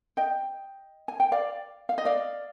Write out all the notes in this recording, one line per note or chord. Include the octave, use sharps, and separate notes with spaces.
D#5 G5
G#5
G5
D5 F5
F5
D#5
D5 F5